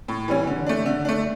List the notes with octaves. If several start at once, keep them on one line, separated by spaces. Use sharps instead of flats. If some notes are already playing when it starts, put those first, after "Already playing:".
A2
E3 G3 C#4
D3
A3 D4
D3
A3 D4